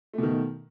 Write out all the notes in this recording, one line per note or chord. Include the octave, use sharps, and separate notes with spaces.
B2 D#3 A3